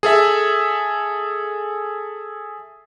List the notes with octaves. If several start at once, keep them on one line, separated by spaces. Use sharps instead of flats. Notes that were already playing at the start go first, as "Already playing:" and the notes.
G#4 A4 E5